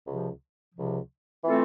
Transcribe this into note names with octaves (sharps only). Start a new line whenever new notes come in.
C#2 C3 F3
C#2 C3 F3
E3 A3 C4 F4 A4